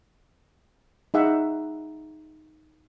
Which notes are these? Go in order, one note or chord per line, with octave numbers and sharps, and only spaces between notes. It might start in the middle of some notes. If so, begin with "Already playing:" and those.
D#4 G#4 E5 F#5